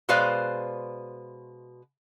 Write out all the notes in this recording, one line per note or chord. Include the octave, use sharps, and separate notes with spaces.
B2 G#3 B4 C5 D5 F5